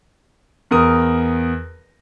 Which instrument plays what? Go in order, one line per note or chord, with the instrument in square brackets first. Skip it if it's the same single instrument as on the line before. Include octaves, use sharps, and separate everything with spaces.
[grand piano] E2 A#4 D#6